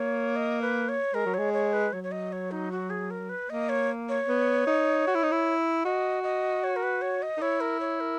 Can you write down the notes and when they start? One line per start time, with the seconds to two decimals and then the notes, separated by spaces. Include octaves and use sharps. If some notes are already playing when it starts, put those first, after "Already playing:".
Already playing: A#3 C#5
0.36 D#5
0.62 B4
0.89 C#5
1.14 G#3 A#4
1.26 F#3
1.34 G#3 C#5
1.54 C#5
1.73 B4
1.93 F#3 C#5
2.04 C#5
2.12 D#5
2.32 C#5
2.51 D#4
2.72 F#4
2.90 G#4
3.11 A#4
3.29 B4
3.49 A#3 D#5
3.69 C#5
4.09 C#5
4.28 B3
4.67 D#4
5.07 F#4
5.14 E4
5.23 D#4
5.31 E4
5.85 F#4 D#5
6.23 D#5
6.64 C#5
6.76 A#4
6.83 B4
7.02 C#5
7.22 D#5
7.37 D#4
7.41 E4 C#5
7.61 A#4
7.80 C#5
8.00 A#4